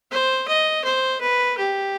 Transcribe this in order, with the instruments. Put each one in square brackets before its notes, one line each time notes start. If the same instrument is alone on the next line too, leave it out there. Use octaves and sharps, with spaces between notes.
[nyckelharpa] C5
D#5
C5
B4
G4